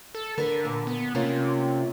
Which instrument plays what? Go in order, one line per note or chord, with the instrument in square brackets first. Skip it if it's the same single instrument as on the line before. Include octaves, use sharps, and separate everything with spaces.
[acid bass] A4
[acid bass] D3 [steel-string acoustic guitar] A#4 B4
[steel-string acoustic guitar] A#2
[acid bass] B3
[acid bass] C3 [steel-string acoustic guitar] A#3 C#4 F4